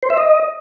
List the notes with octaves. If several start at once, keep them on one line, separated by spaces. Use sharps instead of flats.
C5
E5
D#5